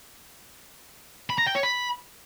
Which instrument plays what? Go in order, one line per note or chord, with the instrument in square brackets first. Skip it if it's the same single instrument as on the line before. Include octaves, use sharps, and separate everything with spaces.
[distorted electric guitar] B5
A#5
G5
C#5
B5